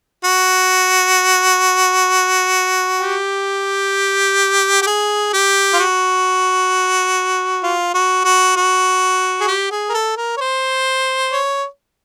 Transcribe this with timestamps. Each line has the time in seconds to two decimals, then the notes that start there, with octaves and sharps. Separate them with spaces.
0.24 F#4
3.01 G4
4.82 G4
4.87 G#4
5.33 G4
5.73 F4
5.79 F#4
7.63 F4
7.94 F#4
8.25 F#4
8.57 F#4
9.41 G#4
9.48 G4
9.71 G#4
9.90 A#4
9.94 A4
10.17 A#4
10.37 C#5
10.41 C5
11.33 C#5